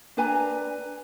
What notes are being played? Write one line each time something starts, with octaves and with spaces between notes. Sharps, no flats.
D4 B4 G#5 A#5